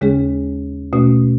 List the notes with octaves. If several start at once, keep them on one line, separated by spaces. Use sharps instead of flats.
D#2 C#3 G#3 C#4 G#4
B2 A3 C#4 F#4